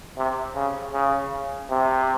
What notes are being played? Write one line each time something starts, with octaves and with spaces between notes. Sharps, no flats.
C3
C#3
C#3
C3